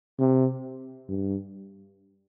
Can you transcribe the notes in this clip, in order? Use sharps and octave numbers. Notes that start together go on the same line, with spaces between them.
C3
G2